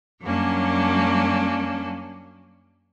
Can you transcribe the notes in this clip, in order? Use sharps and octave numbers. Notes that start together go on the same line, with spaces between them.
F#2 F#3 G3 A#3 C#4 D4